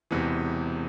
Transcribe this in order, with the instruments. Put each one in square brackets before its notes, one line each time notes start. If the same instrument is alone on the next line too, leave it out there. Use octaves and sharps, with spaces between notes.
[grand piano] E1 E2 C3 E3